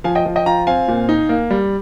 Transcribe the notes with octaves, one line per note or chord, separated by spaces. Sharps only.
F3 F5 G#5
D#5 G5
F3
D#5 G5
F4 G5 A#5
C4 F5 G#5
A#2
D#4
A#3
G3